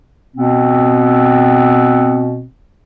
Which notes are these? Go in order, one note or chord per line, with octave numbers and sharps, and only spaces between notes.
B2 B3 C4